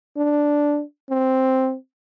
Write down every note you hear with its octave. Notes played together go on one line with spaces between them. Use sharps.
D4
C4